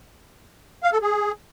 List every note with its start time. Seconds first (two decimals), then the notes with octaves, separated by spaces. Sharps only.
0.83 F5
0.92 A4
1.02 G#4